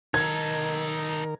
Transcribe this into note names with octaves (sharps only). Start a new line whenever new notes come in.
D#3 D#4 A4 A#4 G#6